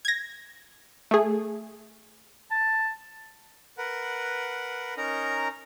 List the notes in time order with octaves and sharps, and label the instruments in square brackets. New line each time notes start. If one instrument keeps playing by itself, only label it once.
[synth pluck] G#6 A#6
A3 G#4
[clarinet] A5
[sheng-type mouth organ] A#4 B4 F#5
C#4 D#4 A#4 A#5